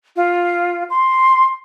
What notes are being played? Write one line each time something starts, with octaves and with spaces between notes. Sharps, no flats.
F4
C6